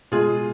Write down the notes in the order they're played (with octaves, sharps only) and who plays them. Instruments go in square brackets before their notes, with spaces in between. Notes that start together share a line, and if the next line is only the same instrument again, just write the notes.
[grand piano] B2 G#3 F4 G#4